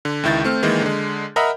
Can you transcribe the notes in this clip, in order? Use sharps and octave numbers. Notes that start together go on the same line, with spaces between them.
D3
C#2 D#3 E4 G6 A6
A3 C4 F6
D#3 E3 G#3 A#3
D3 G#3
A#4 D#5 E5 F#5 A#5 B5